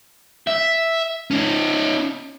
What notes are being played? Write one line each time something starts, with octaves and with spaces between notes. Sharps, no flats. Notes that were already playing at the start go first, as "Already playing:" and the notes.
E5
C#4 D#4